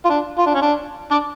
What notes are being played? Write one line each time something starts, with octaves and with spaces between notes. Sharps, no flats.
F4
D4
F4
D4
C#4
D4
D4 D5